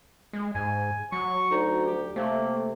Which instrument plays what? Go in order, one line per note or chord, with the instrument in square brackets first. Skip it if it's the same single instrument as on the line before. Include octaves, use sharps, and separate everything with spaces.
[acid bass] G#3
[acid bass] G#2 [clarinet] G#5
[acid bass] F#3 [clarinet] C#6
[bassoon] D2 [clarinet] D#4
[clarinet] G4
[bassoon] C3 [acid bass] A3 [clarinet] A#3